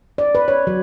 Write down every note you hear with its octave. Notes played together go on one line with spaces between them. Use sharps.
D5
B4
C#5
F#3